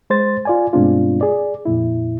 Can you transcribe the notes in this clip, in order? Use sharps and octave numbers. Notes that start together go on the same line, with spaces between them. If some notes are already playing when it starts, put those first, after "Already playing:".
G#3 C5 A6
F4 D5 G#5
G2 B2 G#3 C4 D4 F4
G#4 D5
F2 A#2 E4